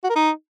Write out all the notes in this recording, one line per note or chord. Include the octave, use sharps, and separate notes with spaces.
F#4
A#4
D#4